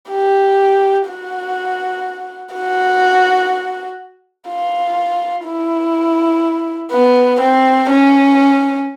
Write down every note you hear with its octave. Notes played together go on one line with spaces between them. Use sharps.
G4
F#4
F#4
F4
E4
B3
C4
C#4